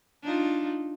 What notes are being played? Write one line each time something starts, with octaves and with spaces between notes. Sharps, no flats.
D4 D#4 F4